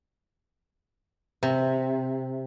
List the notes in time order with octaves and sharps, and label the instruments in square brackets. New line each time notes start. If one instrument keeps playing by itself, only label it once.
[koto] C3